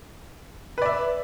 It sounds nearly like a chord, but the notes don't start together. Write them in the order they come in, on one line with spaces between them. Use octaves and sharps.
B4 D5 E5